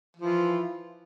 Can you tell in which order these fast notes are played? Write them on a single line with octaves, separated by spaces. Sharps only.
F3 E3 F4